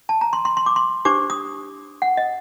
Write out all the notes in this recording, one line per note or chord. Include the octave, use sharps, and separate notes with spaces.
A5
A#5
C6
C6
C6
D6
C6
D4 G4 C5 D6
D#6
F#5
D#5